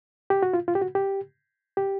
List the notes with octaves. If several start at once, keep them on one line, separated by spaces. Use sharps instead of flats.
G4
F#4
F4
F4
G4
F#4
G4
G4